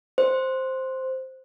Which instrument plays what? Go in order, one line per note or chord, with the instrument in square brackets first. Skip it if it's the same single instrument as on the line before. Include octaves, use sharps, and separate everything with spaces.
[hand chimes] C5